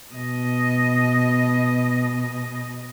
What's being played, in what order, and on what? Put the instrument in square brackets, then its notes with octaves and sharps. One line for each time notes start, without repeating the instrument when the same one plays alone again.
[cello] B2 D#5